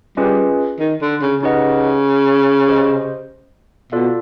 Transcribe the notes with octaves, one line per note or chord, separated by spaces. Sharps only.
G3 C#4 F4 G#4 B4 D#5
D#3
D3
C#3
C#3 D#4 G4 B4 D#5 F#5
G4 C5 D#5
B2 F4 A4 D5 F5